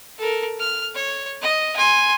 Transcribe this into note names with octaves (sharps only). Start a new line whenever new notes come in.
A4 A#4
F6
C#5
D#5
G#5 C6